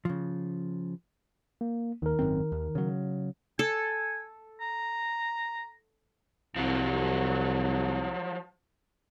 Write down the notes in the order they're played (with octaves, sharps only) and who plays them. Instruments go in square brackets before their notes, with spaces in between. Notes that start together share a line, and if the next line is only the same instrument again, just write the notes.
[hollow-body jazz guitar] C#3 F3
[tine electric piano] A#3
[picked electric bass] D#2 [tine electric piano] D#3 A#4
[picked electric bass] G#1 F#2 C4
D#2
C#3 F#3
[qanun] A4 [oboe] G#5
[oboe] A#5
[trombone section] C2 [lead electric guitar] F3 F#3